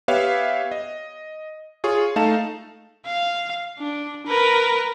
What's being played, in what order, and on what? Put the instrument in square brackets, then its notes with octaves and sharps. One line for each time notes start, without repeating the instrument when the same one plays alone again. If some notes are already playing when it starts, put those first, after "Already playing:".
[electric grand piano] B3 G4 B4 C#5 E5 F5
D#5
F4 G#4 C#5 C#6
A3 D#4 F5 A5 E7
[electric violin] F5
D4
A#4 B4